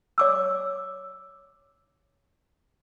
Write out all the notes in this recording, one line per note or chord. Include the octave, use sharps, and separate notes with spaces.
C#5 D6 E6